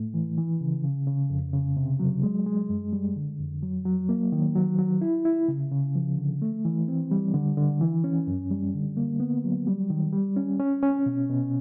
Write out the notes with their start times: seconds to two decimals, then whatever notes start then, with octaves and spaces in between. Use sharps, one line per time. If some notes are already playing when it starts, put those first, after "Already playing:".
Already playing: A2 A3
0.14 E3
0.37 E3
0.61 C#3
0.84 C#3
1.07 C#3
1.30 F2
1.53 C#3
1.77 C3
2.00 F#3
2.23 G#3
2.46 G#3
2.69 F#2
2.93 G3
3.16 D3
3.39 F2
3.63 F#3
3.85 F#3
4.09 A#3
4.32 D#3
4.55 F#3
4.79 F#3
5.01 E4
5.25 E4
5.48 C#3
5.72 C#3
5.95 F3
6.18 D3
6.42 A3
6.65 E3
6.88 C4
7.11 G3
7.34 D3
7.57 D3
7.81 E3
8.04 C#4
8.27 F#2
8.50 G3
8.74 D3
8.97 A#3
9.20 B3
9.44 F#3
9.67 G3
9.90 D#3
10.13 G3
10.37 C#4
10.60 C#4
10.83 C#4
11.06 B2
11.29 B2